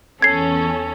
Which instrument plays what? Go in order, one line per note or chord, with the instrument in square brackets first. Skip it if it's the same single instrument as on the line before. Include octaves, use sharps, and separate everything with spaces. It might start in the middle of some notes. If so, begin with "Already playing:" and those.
[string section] E2 C#4 [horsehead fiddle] A4 [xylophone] G#6 C7